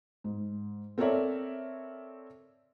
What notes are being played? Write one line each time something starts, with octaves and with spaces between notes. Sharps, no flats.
G#2
C4 A4 A#4 C#5 D5 E5